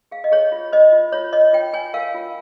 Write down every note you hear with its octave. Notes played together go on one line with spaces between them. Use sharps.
G#4 F5
D#5
G#4 C#5
F4
C5 D#5
F4
F4 C#5
C#5 D#5
F4 G5
C#5 G#5
A#4 F5
F4